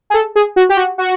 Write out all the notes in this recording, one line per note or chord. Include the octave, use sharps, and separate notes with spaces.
G#4
A4
G#4
F#4
G4
F#4
F#4